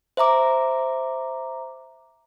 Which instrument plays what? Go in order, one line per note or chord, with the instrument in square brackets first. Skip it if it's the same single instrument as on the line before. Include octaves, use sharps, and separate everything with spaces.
[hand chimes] C5 E5 A#5 D6